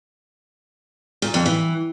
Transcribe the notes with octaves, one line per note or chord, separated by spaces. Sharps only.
A#2
F2
E3